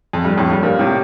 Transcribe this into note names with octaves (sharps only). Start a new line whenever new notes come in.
F2
G2
F2 A2
G2
G2 A#2
A2 C3